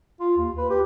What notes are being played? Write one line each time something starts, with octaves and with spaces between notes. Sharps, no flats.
F4
D#2
B4
G4